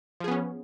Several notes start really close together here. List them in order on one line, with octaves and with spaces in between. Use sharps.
F3 G#4 B3 C#4